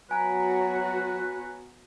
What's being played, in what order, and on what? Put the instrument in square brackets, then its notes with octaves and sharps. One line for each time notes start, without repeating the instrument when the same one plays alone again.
[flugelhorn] F#3 [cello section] B3 F#4 C#5 [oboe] B4 [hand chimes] G#5 A#5